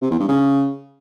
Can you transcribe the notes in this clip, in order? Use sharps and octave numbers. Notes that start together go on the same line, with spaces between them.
C3
E2
G2
C#3